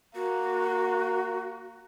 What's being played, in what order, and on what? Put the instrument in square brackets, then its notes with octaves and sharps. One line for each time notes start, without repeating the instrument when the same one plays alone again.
[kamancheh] A#3 [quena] F#4